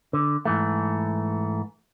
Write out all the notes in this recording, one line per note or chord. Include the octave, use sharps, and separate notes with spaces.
D3
G#2 E3 A3